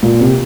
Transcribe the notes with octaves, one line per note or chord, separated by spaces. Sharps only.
A#2
C3